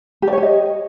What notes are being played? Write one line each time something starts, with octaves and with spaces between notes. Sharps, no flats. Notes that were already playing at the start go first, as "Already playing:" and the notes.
G4
D5
C#5
G4
D#5